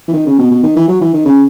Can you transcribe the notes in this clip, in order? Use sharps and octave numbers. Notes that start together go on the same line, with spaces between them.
E3
D#3
C#3
B2
B2
D#3
E3
F#3
E3
D#3
C#3